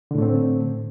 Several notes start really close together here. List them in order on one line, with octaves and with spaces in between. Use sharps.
D3 A2 A3 C4